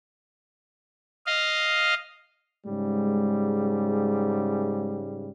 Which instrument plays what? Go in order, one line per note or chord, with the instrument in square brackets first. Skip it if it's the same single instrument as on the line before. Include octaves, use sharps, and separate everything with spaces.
[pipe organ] D#5 F5
[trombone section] G#2 C#3 G3 [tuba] G#3